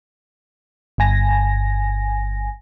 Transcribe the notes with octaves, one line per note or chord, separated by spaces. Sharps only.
G1 G2 G#5 A#6